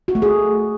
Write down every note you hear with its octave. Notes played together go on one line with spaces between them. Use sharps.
F#4
A3
G#4